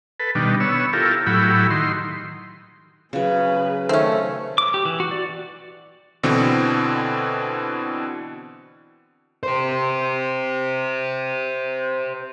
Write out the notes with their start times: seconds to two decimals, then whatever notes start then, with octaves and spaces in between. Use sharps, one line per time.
0.20 A4 B4
0.35 B2 D#3 G3 D4
0.60 B3 C#5 E6
0.93 E4 F4 G4 A4 A#4
1.26 A2 F#3 E4 G4 B5
1.70 D#3 C6
3.13 C#3 F#3 G#4 B4
3.89 D#3 A3 C4 C#4
4.58 D6
4.74 G4
4.85 E3
5.00 F#4
5.11 D5
6.23 B2 D3 E3 C4
9.43 G4 C5